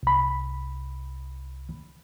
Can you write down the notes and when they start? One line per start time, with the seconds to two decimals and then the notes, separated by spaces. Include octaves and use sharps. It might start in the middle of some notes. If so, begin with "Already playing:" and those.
0.03 C2 B5